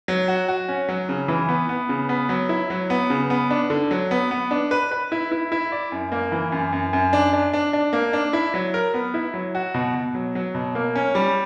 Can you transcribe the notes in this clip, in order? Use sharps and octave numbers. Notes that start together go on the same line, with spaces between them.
F#3
F#4
F#4
C#4
F#3
C#3
E3
B3
B3
C#3
B3
F#3
E4
F#3
B3
C#3
B3
D4
D3
F#3
B3
B3
D4
B4
B4
E4
E4
E4
D5
F#2
A#3
E3
F#2
F#2
F#2
D4
D4
D4
D4
A#3
D4
E4
F#3
A#4
B3
E4
F#3
F#4
B2
B2
F#3
F#3
B2
A#3
C#4
G3